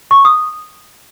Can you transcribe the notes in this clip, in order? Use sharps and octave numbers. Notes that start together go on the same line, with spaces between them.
C#6
D#6